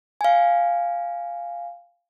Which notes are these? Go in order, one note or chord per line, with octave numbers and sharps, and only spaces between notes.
F5 G#5